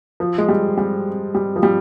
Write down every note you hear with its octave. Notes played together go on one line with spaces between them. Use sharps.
F3
G#3
G3
G3
G3
F3
G3